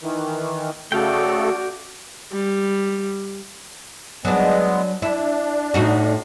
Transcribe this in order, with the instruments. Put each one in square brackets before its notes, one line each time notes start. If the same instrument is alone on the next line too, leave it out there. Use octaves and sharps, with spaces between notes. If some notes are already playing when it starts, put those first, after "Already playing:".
[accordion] D#3 E3
[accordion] C#3 A3 A4 [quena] F#4 [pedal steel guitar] D5 F5 G5
[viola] G3
[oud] F#3 D4 [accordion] G#3 B3
[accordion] D4 [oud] E4
[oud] A2 D#4 F#4